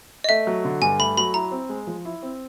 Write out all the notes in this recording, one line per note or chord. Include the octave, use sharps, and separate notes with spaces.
D#5
A3 E5
F#3
D3
G2 G#5
A3 B5
F#3 B5
E4 A#5
C4
G#3
F3
E4
C4